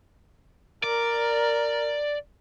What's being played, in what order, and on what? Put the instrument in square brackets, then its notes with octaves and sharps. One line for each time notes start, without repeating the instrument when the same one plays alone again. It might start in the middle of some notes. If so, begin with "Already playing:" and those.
[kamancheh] A#4 [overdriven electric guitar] D5